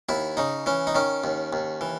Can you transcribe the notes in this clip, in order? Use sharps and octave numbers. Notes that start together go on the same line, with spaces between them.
D#2 E4
C#3 D#4
E3 C#4
D#4
D#3 C#4
D#2
D#2
E3